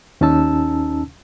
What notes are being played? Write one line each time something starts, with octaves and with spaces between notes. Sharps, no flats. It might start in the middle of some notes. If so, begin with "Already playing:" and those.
D#2 C#4 D#4 A5 E6